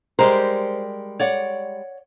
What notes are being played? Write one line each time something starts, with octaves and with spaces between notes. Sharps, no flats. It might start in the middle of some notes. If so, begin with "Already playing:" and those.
G3 G#3 G4 A#4 C5
C#5 D5 F#5